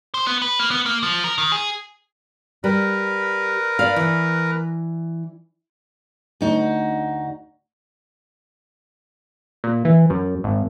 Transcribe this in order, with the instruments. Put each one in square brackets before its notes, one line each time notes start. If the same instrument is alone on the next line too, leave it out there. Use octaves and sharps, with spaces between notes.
[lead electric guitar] C5
B3
B4
A#3
B3
A#3
F3
A#4
D#3
G#4
[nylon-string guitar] G3 [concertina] A#4 B4
[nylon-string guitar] D5 F5
E3
[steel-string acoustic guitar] D2 D#4 F#4
[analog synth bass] A#2
E3
F#2
G#1